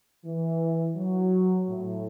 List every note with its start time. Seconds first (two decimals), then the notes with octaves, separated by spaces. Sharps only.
0.24 E3
0.96 F#3
1.68 A2